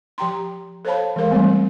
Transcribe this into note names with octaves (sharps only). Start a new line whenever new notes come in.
F3 G4 G5 A#5 C6
A4 C5 C#5 F5 A5 B5
E3 G#3 G#4 A#4 F5
E3 G3 A3 B3 C4